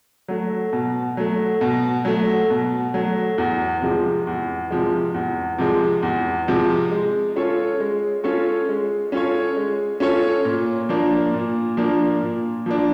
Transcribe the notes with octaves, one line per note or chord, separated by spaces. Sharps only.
F#3 A3
B2
F#3 A3
B2
F#3 A3
B2
F#3 A3
E2
C3 F3 G#3
E2
C3 F3 G#3
E2
C3 F3 G#3
E2
C3 F3 G#3
G#3
C#4 F4 A4 C#5
G#3
C#4 F4 A4 C#5
G#3
C#4 F4 A4 C#5
G#3
C#4 F4 A4 C#5
A#2
F3 A#3 D4
A#2
F3 A#3 D4
A#2
F3 A#3 D4